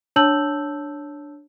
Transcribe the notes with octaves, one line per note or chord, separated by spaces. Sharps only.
D4 C#5 A5 E6 G6 F#7